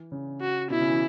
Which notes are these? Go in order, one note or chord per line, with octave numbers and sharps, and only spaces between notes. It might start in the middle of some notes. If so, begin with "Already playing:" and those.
Already playing: E3
C#3
F#4
B2 E4
C#3
E3